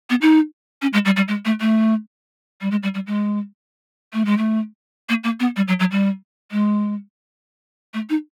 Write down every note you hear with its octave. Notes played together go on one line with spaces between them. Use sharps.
B3
D#4
C#4
G#3
G3
G3
G#3
A3
A3
G3
G#3
G3
G3
G#3
A3
G#3
A3
A#3
A#3
B3
G3
F#3
F#3
G3
G#3
A3
D#4